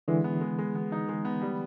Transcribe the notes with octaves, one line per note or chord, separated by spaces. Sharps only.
D3 E3 G#3
B3
G#3
G#3
B3
D#4
G#3
B3
G3